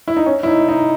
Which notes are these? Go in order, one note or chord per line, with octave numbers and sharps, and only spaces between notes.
E4
D#4
C#4
E4
D#4
D#4